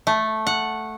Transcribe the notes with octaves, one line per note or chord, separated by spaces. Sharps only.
A3
F#5